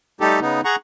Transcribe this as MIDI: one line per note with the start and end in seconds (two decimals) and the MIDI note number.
0.21 0.40 55
0.21 0.40 57
0.21 0.40 63
0.21 0.40 67
0.21 0.40 69
0.41 0.61 49
0.41 0.61 59
0.41 0.61 63
0.65 0.76 68
0.65 0.76 78
0.65 0.76 82
0.65 0.76 85